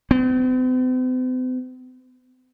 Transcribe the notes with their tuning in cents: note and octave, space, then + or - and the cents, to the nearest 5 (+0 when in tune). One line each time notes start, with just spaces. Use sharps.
C4 -45